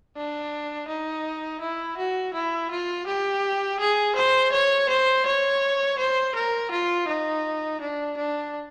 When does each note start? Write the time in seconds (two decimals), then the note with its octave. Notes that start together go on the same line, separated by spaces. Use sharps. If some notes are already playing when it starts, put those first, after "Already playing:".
0.16 D4
0.88 D#4
1.61 E4
1.98 F#4
2.34 E4
2.71 F4
3.07 G4
3.80 G#4
4.16 C5
4.52 C#5
4.89 C5
5.26 C#5
5.99 C5
6.35 A#4
6.71 F4
7.08 D#4
7.81 D4
8.17 D4